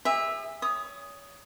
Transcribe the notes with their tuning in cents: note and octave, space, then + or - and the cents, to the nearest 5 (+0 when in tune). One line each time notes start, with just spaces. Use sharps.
G#4 -40 E5 +0
C#5 +30 D#6 +0